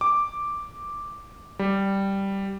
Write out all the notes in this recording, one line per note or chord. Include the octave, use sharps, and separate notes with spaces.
D6
G3